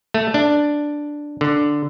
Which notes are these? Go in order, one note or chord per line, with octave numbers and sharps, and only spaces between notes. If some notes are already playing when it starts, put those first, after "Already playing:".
A3
D4
D3